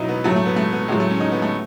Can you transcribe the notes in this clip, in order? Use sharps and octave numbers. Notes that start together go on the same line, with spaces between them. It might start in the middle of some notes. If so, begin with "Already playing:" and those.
Already playing: B2 F#3 D#4 E4
B3
A2 F#3 A3
A3
B3
A3
B3
A2 F#3 G#3
A3
C#4
D#4
B3
A3